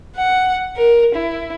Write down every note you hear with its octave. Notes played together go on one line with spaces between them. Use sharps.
F#5
A#4
E4